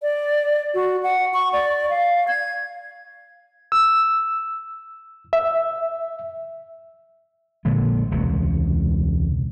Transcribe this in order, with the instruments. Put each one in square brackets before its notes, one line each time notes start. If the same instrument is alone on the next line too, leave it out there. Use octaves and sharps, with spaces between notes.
[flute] D5
F#4
F#5
C#6
D5
F5
G#6
[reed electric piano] E6
E5
[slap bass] A#1 A#2 D3 G#3
E1 C#2 C3